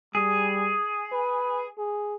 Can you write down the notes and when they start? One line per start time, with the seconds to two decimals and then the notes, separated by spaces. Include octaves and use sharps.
0.15 G3 G#4
1.12 B4
1.78 G#4